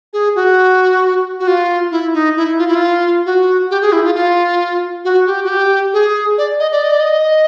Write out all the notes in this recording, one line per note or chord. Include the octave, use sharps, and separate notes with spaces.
G#4
F#4
F#4
F4
E4
D#4
E4
F4
E4
F4
F#4
G4
G#4
E4
F4
F4
F#4
G4
F#4
G4
G#4
D5
D#5
D5
D#5
D5
D#5